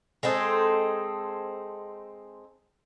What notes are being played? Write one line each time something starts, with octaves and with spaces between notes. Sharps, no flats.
G#3 C4 D#4 A4